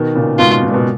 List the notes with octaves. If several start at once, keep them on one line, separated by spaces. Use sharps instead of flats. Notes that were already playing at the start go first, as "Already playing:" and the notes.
Already playing: B2 D#3
A#2 C#3
G#2 B2 F4
G#2
A#2
B2